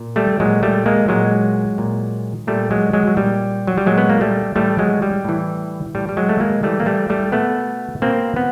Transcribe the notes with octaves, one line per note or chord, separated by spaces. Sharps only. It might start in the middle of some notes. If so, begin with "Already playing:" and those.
Already playing: A#2
G3 A3
A#2 F#3 G#3
G3 A3
G#3 A#3
A#2 F#3 G#3
A#2
A#2 G3 A3
F#3 G#3
F#3 G#3
F#3
A#2 G3
F#3
G3
A#2 F#3 G#3
B3
A#3
G3 A3
A2 E3 G3 A3
F#3 G#3
G3
A2 E3
A2 E3 G3
G3
F#3 G#3
A3
G#3 A#3
A2 E3 G3 A3
A#3
G3 A3
G3 A3
B2 A3 B3
B2 A#3 C4
B3